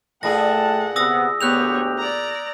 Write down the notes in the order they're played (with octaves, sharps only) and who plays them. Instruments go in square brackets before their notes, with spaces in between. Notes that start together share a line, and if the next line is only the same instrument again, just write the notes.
[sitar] A#2 E4 G#4 [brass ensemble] A3 G5 A5 [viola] F#5 [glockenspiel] A#6
[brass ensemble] C3 B3 [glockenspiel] D#6 E6 A#6
[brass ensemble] D2 G4 [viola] B3 C#5 [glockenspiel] F#6 G6 F7
[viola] D5 A#5